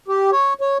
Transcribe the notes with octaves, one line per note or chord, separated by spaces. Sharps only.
G4
C#5
C#5